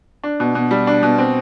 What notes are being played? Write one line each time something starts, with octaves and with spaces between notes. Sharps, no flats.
D4
B2
B2
G3
D4
B2
C4